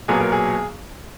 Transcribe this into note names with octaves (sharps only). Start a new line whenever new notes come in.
B1 A#2 F#3 B3 G#4
A#4
G#4